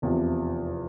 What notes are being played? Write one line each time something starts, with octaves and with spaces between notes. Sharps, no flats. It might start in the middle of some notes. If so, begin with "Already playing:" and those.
F1 E2 C3 F3